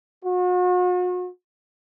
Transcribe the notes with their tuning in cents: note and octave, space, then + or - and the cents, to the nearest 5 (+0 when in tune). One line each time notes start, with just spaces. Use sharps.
F#4 -40